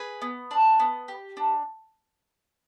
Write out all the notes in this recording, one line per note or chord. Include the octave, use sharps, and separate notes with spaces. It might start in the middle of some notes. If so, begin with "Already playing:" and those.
Already playing: G#4 B4
B3
D4
B3
G4
D4